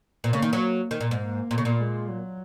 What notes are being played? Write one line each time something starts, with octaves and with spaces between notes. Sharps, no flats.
A#2
C#3 A#3
D#3
F#3
D#3
A#2
G#2
A#3
A#2
C#3
A#2
G#3
F#3